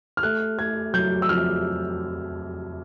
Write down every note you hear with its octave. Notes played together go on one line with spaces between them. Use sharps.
F6
A3 F#6
A3 G#6
F#3 G6
E6
F2 F6